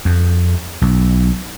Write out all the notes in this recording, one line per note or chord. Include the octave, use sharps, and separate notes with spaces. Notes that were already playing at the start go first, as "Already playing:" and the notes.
F2
B1